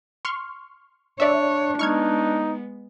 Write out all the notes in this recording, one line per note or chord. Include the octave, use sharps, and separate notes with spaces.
C6 C#6 F6
D4 C#5 D5 E5
G#3 B3 D#4 C#6 F6 G#6